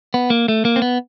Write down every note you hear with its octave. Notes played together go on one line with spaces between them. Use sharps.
B3
A#3
A3
A#3
C4
B3